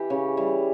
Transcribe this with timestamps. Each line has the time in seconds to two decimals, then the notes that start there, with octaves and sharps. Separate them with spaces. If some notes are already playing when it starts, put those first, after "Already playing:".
Already playing: E3 G4
0.10 C#3
0.37 E3 G3